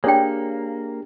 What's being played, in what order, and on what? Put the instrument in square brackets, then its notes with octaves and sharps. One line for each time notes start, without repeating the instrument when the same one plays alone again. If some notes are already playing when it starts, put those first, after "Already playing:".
[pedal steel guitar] A#3 [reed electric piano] D4 G4 G#4 [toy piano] C#5 G5